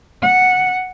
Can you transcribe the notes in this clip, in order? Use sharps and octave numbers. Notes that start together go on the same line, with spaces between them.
F#5